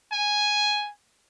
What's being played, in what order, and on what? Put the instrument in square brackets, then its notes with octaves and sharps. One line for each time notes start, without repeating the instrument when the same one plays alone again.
[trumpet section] G#5